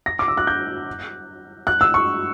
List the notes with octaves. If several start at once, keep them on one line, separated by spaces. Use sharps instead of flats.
A#6
D6
E6
F#6
G6
F#6
E6
C#6